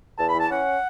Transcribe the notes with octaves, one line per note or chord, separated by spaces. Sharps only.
E2 A5
B5
E3
A5
C#4 F#5